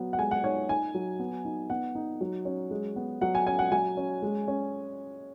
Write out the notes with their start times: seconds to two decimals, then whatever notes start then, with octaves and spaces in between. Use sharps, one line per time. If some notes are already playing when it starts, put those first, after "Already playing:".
Already playing: F#3 B3
0.13 F#5
0.19 G#3 G#5
0.31 F#5
0.44 D#4 C#5
0.69 D#4 G#5
0.94 F#3
1.19 B3
1.45 D#4
1.70 B3 F#5
1.95 D#4
2.21 F#3
2.45 C#4
2.71 G#3
2.96 B3
3.21 F#3 F#5
3.35 G#5
3.47 C#4 G#5
3.59 F#5
3.72 F#3 G#5
3.97 C#4
4.22 G#3
4.48 C#4